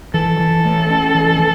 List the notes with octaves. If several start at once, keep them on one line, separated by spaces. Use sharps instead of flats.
E3 A4
E3
A3
C#4
E3
E3